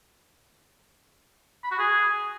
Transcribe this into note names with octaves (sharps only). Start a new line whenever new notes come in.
B5
F#4
G#4